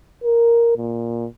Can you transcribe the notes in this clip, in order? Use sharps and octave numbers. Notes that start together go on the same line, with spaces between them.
A#4
A#2